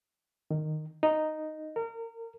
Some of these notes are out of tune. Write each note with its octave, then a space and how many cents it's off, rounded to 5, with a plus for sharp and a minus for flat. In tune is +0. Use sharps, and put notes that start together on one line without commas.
D#3 -10
D#4 -5
A#4 -30